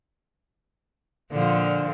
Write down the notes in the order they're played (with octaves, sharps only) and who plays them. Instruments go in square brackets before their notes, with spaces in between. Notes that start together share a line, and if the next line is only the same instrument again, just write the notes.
[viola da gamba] A#2 D3 F3